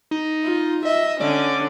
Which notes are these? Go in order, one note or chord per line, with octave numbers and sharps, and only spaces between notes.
D#4
F4
D#5 E5
D3 C#4 D5